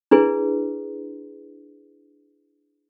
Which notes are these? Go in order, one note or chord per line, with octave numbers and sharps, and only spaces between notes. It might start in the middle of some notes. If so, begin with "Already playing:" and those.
D4 E4 G#4 B4